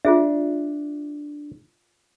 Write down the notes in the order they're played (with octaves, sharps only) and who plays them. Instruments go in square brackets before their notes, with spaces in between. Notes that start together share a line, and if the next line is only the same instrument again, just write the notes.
[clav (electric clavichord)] D4 [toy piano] F4 G#4 E5